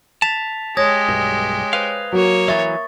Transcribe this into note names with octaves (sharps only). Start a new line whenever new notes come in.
A5 A6 B6 F7
G#3 G4 C#5 D#6 G#6 A#6
B1 G2
B4 C5 F5
F#3 A#3 C#5
E3 F#3 E5 C#6 A6